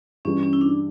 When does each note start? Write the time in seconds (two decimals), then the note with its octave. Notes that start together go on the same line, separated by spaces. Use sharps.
0.25 G2 E3 G3 C#4
0.43 C#4
0.53 E4
0.61 D4